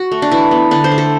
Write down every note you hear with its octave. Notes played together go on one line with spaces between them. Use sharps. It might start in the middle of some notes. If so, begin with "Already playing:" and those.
Already playing: F#4
A3
D4
E3 E4
B3
D3 D4
C5
A3
A4